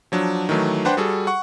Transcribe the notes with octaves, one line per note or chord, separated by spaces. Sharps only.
F3 F#3 D4
D#3 E3 F#3 A3
D4 B4 C5 F#5 G5 C6
G3 F#4 G#4 A4
F#5 C#6